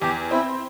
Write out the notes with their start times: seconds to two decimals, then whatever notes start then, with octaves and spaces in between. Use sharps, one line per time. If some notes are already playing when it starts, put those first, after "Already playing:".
0.01 E2 G4
0.31 C4 E4